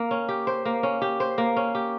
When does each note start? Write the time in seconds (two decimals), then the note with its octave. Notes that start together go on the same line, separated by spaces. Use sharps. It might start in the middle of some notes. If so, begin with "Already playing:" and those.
Already playing: A#3
0.11 C#4
0.29 G4
0.47 C5
0.65 A#3
0.83 C#4
1.02 G4
1.20 C5
1.38 A#3
1.57 C#4
1.75 G4